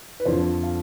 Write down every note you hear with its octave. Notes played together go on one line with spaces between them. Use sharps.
B4
F2 D3 F3 C5
F5